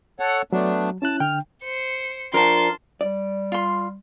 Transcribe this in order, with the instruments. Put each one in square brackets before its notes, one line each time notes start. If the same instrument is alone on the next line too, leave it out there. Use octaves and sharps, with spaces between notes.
[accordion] A4 C#5 F#5
[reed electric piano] F#3 [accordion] A3 B3 D4
[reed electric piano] C#4 E4 F#6 [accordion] A5
[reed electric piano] D3 G5 [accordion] F6
[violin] C5 C#7
[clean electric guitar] F3 D4 A#4 [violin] A5 C6
[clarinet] G3 [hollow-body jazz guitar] D5
[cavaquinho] F4 C6